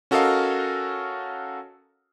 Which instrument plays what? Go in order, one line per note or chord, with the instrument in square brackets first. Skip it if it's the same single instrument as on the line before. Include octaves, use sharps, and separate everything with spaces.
[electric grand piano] C#4 F#4 A4 A#4 D#5 F5